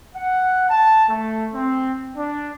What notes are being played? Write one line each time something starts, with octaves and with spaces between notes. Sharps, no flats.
F#5
A5
A3
C4
D4